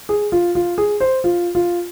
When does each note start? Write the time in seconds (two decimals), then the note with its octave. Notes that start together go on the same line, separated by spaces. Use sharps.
0.09 G#4
0.32 F4
0.55 F4
0.78 G#4
1.00 C5
1.24 F4
1.55 F4